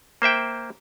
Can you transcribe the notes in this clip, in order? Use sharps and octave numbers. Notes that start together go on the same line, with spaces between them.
A#3 C5 E5 G5